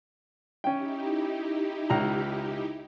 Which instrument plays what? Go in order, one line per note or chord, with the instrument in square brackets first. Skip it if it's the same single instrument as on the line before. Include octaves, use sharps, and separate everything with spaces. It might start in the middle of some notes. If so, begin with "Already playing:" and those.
[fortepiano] C#4 G5 [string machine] D#4 E4 G4
[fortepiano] C#2 A#5